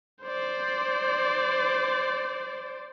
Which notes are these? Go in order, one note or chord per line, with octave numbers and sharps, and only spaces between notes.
C5 D5